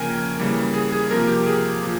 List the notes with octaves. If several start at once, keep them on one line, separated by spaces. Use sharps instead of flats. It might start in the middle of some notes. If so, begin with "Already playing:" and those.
Already playing: C#3 F3 A#3 A#4 G5 G#5
C#3 E3 G3 A#3
G#4
G#4
C3 F3 A#3 A#4
G4
G#4
A#2 F3